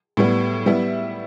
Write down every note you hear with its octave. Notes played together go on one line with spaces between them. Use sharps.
A2 G3 B3
G3 B3 E4